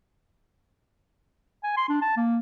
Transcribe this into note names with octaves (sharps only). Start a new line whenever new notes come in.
G#5
C6
D4
A5
A#3